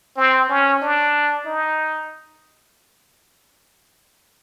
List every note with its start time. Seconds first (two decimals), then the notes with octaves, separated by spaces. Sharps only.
0.17 C4
0.50 C#4
0.82 D4
1.46 D#4